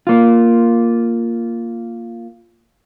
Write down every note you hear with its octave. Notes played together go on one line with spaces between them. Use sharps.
A#3 F4